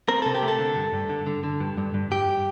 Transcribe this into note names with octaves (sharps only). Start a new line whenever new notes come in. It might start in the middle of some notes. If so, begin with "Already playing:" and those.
C4 A#4
C3 A4
G4
A3
A4
D3
G2
G2
D3
D3
D3
G2
G2
G2
G2 G4